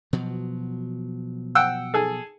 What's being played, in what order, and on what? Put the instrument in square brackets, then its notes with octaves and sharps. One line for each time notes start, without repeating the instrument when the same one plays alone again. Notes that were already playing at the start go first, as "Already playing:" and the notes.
[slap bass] B2 F3 F#3
[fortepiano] F#5 G5 E6
G#4 A4